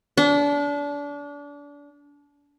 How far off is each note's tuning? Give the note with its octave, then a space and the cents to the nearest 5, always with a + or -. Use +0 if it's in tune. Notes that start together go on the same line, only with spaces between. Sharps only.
D4 -30